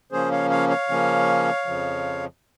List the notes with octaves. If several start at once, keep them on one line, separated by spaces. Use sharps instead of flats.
C#3 F3 A#3 C#4 G#4 C5
C#5 F5
C#5 F5
C#5 F5
C#3 F3 A#3 C#4
F2 C#3 F3